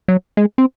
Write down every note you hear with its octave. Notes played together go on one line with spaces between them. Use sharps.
F#3
G#3
C4